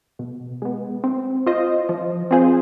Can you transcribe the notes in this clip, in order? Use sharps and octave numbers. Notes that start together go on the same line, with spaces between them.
B2
G#3 B3
C4
F4 C5 D#5
F3
C4 F4 G#4 C5